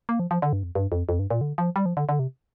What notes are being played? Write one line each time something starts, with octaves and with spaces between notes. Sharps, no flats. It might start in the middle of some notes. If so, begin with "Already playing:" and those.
A#3
F3
F3
D3
G2
F2
G2
F2
F2
G2
A#2
D3
F3
G3
F3
D3
D3
C3